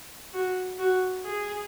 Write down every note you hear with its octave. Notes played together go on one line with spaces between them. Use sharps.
F#4
F#4
G#4